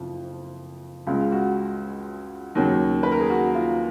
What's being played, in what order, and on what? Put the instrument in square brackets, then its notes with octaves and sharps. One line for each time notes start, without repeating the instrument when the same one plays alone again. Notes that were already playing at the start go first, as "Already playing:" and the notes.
Already playing: [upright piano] F#1 F2 F3 F4
C#2 C#3 G#3 F4
F#4
D#2 C#3 F#3
B4
A#4
G#4
F#4
F4